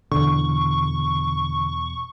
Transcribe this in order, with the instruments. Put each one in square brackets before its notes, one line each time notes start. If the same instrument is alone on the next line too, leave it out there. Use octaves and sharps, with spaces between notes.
[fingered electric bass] E2 B2 [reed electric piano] D3 [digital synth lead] C#6